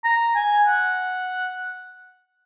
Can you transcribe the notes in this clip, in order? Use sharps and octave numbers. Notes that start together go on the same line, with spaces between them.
A#5
G#5
F#5